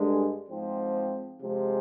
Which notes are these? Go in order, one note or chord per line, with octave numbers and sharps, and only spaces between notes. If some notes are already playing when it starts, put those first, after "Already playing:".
Already playing: G2 D3 G#3
G#2 F3 C4
C3 F3 G#3